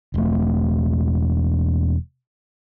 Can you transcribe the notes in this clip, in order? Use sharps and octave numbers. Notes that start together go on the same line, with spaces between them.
E1 A3